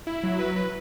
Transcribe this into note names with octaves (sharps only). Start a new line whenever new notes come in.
E4
F#3
B4
B4